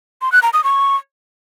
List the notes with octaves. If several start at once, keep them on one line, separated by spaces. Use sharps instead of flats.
C6
F#6
A#5
D#6
C#6